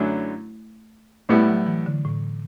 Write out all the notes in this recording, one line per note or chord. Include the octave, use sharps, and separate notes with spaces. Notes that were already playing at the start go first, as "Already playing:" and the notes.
Already playing: F#2 D3 F#3 A3 C#4 E4
A2 G3 A3 B3 E4
F#3
E3
D3
A2